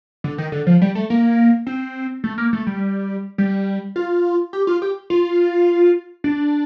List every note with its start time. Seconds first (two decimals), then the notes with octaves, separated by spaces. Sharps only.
0.24 D3
0.38 D#3
0.52 D3
0.67 F3
0.82 G3
0.95 A3
1.10 A#3
1.67 C4
2.24 A3
2.38 A#3
2.53 A3
2.67 G3
3.38 G3
3.96 F4
4.53 G4
4.67 F4
4.82 G4
5.10 F4
6.24 D4